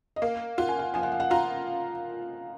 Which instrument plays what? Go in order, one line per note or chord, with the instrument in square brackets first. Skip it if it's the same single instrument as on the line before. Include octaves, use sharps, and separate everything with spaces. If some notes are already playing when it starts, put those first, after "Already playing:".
[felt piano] D#5
[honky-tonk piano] A#3 [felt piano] F5
[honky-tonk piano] F4 [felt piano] F#5
[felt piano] G#5
F#5
[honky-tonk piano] F3 [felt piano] G#5
[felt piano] F#5
F5
F#5
[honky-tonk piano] F4 [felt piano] A#5